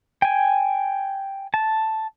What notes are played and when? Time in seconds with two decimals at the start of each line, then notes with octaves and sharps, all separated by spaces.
0.22 G5 G#5
1.54 A5